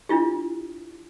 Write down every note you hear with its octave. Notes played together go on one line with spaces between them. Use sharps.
D4 E4 F4 G4